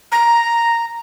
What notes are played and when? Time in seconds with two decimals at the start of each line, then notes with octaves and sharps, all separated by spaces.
0.12 A#5